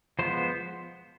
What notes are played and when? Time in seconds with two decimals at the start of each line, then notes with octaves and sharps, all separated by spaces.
0.19 F3 G#3 B3 C5